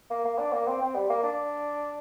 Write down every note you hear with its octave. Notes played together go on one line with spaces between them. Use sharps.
A#3
A#3
D4
A#3
C4
C4
G3
A#3
D4